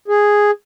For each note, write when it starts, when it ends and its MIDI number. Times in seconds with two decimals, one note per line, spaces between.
0.08 0.51 68